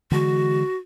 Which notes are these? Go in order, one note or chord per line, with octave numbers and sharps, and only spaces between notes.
D3 E3 G#3 F#4